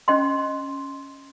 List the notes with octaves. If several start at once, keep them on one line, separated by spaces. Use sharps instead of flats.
C#4 D#5 G5 C6